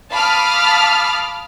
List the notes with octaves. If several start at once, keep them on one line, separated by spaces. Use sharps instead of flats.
F5 A5 B5 D6 D#6 F6